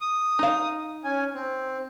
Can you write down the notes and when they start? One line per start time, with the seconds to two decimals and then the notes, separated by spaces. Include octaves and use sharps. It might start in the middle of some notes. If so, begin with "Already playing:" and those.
0.01 D#6
0.39 D#4 F5
1.04 C#4 G#5
1.34 C4